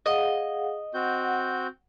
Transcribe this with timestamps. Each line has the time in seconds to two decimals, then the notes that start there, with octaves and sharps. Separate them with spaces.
0.06 G#4 D#5 F5 F#5
0.94 C4 F#4 F#5 G6